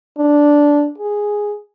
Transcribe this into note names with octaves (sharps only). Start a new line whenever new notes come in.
D4
G#4